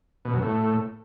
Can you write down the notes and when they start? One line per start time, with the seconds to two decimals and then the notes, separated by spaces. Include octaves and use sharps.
0.25 B2
0.34 F#2
0.42 A2